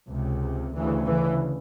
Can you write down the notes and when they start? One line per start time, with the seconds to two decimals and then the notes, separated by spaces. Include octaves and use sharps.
0.09 C#2 C3
0.74 D2 C#3 E3
1.06 E3